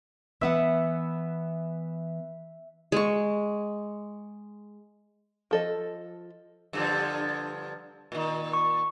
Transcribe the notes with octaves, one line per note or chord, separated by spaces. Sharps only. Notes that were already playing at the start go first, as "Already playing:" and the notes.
E3 B3 E5 F#5
G#3 C#6
F3 A4 D#5
G2 D3 F3
A#2 D#3
C#6